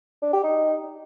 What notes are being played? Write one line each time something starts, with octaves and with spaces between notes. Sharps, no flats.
D4
G4
D#4